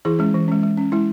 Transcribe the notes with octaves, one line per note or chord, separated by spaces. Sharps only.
E3 E4 G#4
G#3 C#4
E3
G#3 C#4
G#3
C#4
G#3 E4